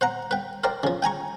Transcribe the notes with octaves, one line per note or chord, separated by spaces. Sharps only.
C5 F#5 A#5
B4 G5
A#4 C5 D5 G5
C#3 F3
G5 G#5 A#5 C#6